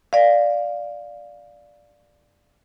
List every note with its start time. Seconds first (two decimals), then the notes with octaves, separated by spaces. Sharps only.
0.13 D5 F5